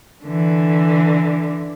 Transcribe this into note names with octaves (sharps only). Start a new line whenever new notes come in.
D3 E3